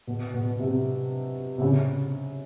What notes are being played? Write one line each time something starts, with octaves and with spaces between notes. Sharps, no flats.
B2
B2
C3
C3
C#3